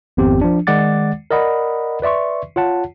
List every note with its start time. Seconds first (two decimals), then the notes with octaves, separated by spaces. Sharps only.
0.17 G#1 F2 B3 C4 G4
0.41 F3 D4
0.67 D#3 G#3 D5 F#5 D6 A6
1.31 A#4 D5 D#5 F#5 B5
2.02 B4 D5 E5 C6 C#6
2.56 F4 C#5 F#5 A5